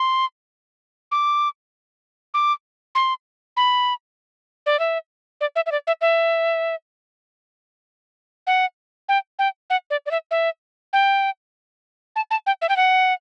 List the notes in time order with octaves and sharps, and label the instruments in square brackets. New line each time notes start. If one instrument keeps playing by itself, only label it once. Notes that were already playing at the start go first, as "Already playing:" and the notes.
Already playing: [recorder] C6
D6
D6
C6
B5
D5
E5
D5
E5
E5
D5
E5
E5
F#5
G5
G5
F#5
D5
D5
E5
E5
G5
A5
A5
G5
E5
G5
F#5